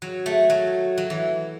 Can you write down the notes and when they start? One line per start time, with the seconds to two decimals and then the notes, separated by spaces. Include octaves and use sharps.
0.02 F#3
0.26 A3
0.50 F#3
0.98 F#3
1.10 E3